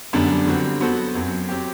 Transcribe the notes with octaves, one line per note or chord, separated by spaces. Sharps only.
F#2 D3 G3 B3 D4
D3 G3 C4 F#4
F#3 B3 F#4 A4 C5
F#2 F#3 C4
F#3 C4 G4